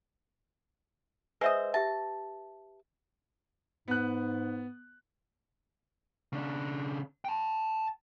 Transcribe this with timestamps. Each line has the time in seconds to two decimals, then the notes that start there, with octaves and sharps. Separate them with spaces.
1.41 G#3 B4 C5 D#5 E5 E6
1.74 G4 E5 A5
3.88 G#2 B3 F#6
6.33 C#3 D4
7.25 G5 A5